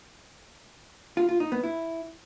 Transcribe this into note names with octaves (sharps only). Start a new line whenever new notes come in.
F4
F4
D#4
B3
E4